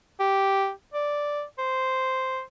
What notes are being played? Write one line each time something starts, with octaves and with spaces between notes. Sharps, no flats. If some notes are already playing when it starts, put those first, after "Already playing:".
G4
D5
C5